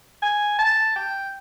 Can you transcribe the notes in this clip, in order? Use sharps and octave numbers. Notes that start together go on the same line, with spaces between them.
G#5
A5
G5